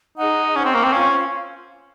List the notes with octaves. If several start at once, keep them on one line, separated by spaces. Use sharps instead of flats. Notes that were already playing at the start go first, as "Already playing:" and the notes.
D#4 G#4 D#5 F#5
C#4 C5 F#5 C#6
C4
A#3
C4
C#4 F4 C5 F5